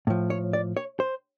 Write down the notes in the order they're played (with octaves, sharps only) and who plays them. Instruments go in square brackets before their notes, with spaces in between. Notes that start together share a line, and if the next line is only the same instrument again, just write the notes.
[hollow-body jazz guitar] A2 F3
C#5
D5
C#5
C5